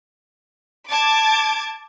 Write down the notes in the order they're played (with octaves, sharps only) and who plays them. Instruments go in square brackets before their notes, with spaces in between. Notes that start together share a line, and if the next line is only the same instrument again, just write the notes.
[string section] A5 D6 G#6